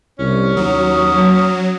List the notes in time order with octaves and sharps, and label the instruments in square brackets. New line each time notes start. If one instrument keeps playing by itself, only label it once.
[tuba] C2 [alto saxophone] C#4
[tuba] D#2 [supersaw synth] F#3 [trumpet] D#6